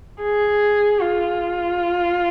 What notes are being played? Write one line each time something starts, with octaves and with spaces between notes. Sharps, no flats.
G#4
F4